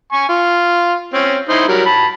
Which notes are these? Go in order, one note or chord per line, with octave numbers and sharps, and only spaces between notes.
G#5 C#6
F4
C4 C#4
D#4 E4 C5
F#3 G3 A#4
A5 B5